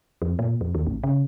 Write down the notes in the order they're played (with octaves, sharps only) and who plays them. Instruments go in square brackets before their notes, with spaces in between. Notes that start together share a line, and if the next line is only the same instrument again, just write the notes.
[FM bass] F2
A#2
F2
D#2
A1
C#3